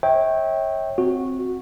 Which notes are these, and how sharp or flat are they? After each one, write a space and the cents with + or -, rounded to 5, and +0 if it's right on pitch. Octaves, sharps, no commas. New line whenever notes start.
C#5 -20 E5 -35 G5 +0
C4 +0 F#4 -15